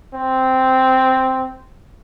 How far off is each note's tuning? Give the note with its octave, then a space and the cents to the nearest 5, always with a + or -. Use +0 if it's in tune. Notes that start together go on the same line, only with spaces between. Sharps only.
C4 -5